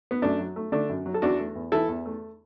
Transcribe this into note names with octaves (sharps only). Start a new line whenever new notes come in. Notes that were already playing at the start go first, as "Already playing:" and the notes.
B3
F#2 A3 D4
F#3
A3
D3 A3 D4
F#2
F#3
A4
E2 D4 F#4
A3
E2
E3 E4 A4
E2
A3